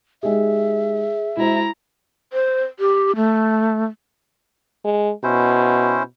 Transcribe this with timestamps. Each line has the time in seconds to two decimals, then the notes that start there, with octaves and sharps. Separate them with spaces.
0.23 G#3 D#4 G4 G#4 E5
1.37 G#3 E4 F#4 C5 A#5
2.33 C5
2.79 G4
3.16 A3
4.85 G#3
5.24 B2 C#4 E4 C5